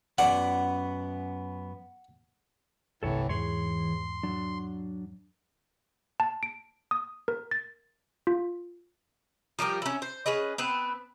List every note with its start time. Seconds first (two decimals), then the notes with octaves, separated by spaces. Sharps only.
0.18 F#2 B3 D5 F#5
3.03 G1 C2 A2 C3 E3 A4 C#5
3.29 E2 G#2 E3 G#4 C#5 C6
4.23 F#3 D4
6.20 A5
6.43 D7
6.91 D#6
7.28 A#4
7.51 A6
8.27 F4
9.59 F3 G3 G4 A#4
9.82 C#4 E4
10.02 C5
10.26 C#4 G#4 B4 D#5
10.58 B3 C4 B4